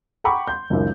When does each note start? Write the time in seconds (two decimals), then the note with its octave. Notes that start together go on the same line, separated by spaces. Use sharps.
0.24 F#5 G5 A#5 B5 C#6 D6
0.48 C6 G6
0.70 F#1 C#2 F#2 D#3